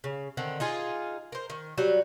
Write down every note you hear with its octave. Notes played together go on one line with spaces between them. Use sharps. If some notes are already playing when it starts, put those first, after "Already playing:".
C#3
D3 D#3 C4
D#4 F4 G#4
A#4 C5
D#3
F#3 G3 F#4